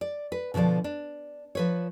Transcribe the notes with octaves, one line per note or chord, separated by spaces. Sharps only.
D5
B4
B2 D3 E3 F3 D5
D4
F3 B4 C#5